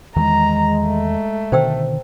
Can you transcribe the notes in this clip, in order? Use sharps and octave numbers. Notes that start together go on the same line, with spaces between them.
E2 D#3 E3 G#3 A#5
A3
B2 D3 D#3 C5 G5 E6